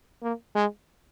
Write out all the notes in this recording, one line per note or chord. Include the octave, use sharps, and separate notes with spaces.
A#3
G#3